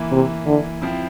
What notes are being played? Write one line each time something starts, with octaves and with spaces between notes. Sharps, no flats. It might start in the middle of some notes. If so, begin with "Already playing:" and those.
Already playing: E3 A#3 E4
C3
D3
F3 C4 E4